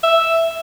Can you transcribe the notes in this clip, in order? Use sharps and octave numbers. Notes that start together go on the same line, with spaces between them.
E5